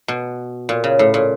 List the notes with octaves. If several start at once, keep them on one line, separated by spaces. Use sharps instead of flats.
B2
A#2
C#3
A2
A#2